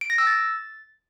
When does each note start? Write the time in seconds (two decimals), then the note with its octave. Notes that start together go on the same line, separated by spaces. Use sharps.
0.01 D7
0.10 A#6
0.18 E6
0.27 A6